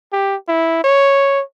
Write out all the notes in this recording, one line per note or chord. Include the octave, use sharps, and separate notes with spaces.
G4
E4
C#5